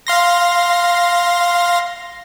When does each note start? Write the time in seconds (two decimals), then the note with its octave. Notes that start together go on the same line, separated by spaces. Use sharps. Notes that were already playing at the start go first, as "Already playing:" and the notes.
0.07 F5 C6 A#6